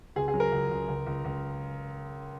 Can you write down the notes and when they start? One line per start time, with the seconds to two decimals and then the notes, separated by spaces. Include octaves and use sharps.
0.16 C#2 G#4
0.28 G#4
0.34 F#3
0.40 A#4
0.51 C#2
0.70 C#2
0.88 C#2
1.06 C#2
1.24 C#2